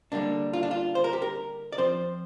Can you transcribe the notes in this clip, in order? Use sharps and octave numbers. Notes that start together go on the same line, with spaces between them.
D3 G3 A#3 D4
F4
D4
F4
C5
A#4
G4
A#4
D5
F3 C4 C5